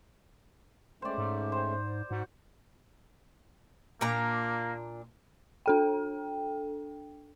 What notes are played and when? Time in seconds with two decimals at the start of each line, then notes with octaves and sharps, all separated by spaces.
1.02 G#3 A3 C#4 C5 D5
1.18 G#2
1.52 C5
2.11 G#2 F#4 F#5
4.01 A#2 A#3 D4 A#5
5.66 D4 A4 G5